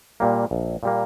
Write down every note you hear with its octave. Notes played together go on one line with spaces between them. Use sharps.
A#2 G3 A#3
A#1
A#2 G3 A#3